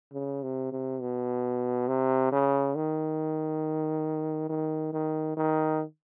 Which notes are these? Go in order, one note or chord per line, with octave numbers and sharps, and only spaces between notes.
C#3
C3
C3
B2
C3
C#3
D#3
D#3
D#3
D#3